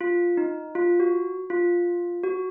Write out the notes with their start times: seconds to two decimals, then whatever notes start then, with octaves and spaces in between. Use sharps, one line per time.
0.01 F4
0.37 D#4
0.75 F4
1.00 F#4
1.50 F4
2.24 F#4